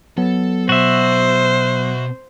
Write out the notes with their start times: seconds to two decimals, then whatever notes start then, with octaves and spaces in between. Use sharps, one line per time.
0.18 F#3 B3 A4
0.69 B2 F#4 C5 E5